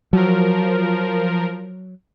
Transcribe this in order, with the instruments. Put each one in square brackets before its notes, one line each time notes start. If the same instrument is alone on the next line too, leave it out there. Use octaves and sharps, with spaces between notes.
[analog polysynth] F3 A#4 [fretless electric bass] F#3